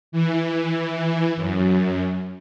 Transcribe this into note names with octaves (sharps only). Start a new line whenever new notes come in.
E3
F#2